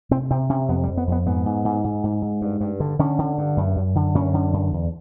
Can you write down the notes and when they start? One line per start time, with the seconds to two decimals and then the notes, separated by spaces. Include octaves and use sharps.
0.11 C3 C4
0.31 C3 C4
0.49 C3 C#4
0.68 F2 B3
0.83 G3
0.88 F2
0.97 B3
1.07 F2 B3
1.26 G#2 B3
1.46 G#2
1.65 G#2
1.84 G#2
2.04 G#2
2.22 G#2
2.42 G2
2.61 G2
2.80 D3
2.99 D3 C#4
3.18 D3
3.38 G2
3.57 F#2
3.76 F#2
3.95 D3
4.15 F#2 C#4
4.34 D3
4.53 F#2
4.73 E2